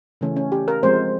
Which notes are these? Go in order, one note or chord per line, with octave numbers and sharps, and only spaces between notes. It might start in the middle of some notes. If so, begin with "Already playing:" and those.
C#3 E3 A3 C#4
C#4
G4
A#4
F3 G#3 C4 C5